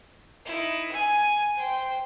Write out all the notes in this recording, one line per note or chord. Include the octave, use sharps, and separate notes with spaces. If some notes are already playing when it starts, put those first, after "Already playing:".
D#4 E4
G#5
C5 G5